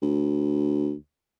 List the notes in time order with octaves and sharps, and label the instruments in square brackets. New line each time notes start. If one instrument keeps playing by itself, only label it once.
[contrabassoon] D2